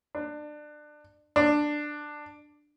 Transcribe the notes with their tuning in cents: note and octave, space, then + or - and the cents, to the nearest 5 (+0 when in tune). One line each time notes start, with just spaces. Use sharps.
D4 +25
D4 +10